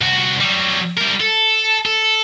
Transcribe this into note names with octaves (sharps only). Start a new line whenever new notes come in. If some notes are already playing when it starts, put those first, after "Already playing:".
C2 F#4
F#3 G3
G3 A#4
A4
A4